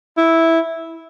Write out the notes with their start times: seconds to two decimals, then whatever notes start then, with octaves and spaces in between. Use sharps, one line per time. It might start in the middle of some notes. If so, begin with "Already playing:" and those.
0.18 E4